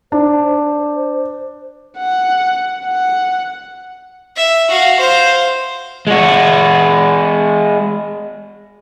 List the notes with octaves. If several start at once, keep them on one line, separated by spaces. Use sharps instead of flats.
D4 C5
F#5
F#5
E5
F#4 F5
C5 F5
G#3 F#4